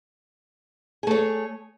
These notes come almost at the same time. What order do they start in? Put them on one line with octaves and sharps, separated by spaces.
G#4 A3 C#5